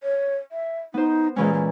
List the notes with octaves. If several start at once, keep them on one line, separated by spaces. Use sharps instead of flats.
C#5
E5
B3 D#4 C5
A#2 E3 G#3 C#4
G#3